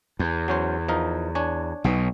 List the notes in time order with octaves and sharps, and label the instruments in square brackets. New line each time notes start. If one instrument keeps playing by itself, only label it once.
[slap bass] E2
[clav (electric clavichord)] F#3 C#4 C5
F3 D#4 A#4
D4 C#5 G#5
[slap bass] B1 B2